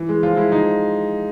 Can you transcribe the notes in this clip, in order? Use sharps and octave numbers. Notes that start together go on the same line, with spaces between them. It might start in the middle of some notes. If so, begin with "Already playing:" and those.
Already playing: E3
G#3
F3 F4
G#3 E4
F3 D#4